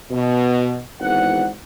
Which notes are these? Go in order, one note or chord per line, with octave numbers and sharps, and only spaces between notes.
B2
G#1 E2 F#5